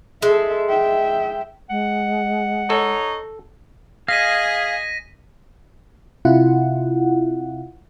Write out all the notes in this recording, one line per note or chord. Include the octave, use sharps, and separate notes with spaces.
G#3 A4 E5
E5 G5
G#3 F#5
D#4 A4 C#5
G#4 D#5 F5 G#5 A#6 B6 D#7
C3 E4 F4 F#5